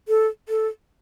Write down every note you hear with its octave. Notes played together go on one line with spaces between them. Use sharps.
A4
A4